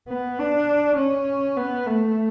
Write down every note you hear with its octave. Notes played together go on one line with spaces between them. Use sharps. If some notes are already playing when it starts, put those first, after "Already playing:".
B3
D4
C#4
B3
A3